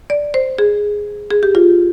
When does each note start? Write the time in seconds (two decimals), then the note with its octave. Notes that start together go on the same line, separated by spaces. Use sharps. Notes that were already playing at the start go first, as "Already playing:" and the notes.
0.10 D5
0.34 C5
0.58 G#4
1.31 G#4
1.43 G4
1.55 F4